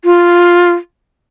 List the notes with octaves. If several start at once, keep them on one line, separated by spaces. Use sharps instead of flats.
F4